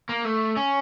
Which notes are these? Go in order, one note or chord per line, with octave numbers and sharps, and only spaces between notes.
A#3
A3
C#4